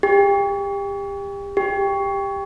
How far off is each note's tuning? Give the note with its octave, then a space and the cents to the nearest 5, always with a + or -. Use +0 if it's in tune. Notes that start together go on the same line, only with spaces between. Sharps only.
G4 +30
G4 +15